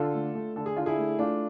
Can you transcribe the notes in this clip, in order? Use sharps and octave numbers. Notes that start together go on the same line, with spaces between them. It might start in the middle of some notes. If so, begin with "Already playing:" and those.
Already playing: D3 F4 A4
A3
A3
D3 A4
G#4
D3 F4
E4 G#4
A3
A3 D4 F4